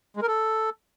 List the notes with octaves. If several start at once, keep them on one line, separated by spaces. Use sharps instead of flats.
G#3
A#4
A4